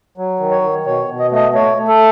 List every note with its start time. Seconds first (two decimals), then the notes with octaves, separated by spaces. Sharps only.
0.17 F#3
0.40 D#3
0.51 C#5
0.62 D#3
0.86 B2 C#5
1.09 B2
1.19 D#5
1.32 A3 D#5
1.54 A3 C#5
1.77 A3
1.88 A4